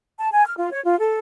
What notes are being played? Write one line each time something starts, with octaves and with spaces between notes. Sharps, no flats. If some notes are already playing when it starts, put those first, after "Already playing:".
A5
G#5
F6
F4
C#5
F4
A4